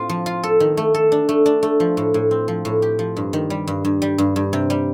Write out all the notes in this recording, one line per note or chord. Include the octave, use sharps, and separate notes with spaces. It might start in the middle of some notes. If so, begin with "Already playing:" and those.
Already playing: A2 C4 F4
F3
F4
A4
D#3
A3
A4
D4
A3
D4
A3
F3
A2
A2
C4
F3
A2
G4
F3
G2
D#3
G3
G2
G2
G3
G2
G2
C3
G3